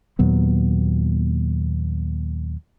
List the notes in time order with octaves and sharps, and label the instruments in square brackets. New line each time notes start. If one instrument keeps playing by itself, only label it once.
[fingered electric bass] D#2 A#2 F#3 B3